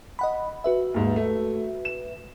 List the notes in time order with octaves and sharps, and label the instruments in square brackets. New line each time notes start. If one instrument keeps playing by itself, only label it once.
[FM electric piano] D#5 F#5 B5
F#4 B4 E5
[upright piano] D#2 G#2
A3
E7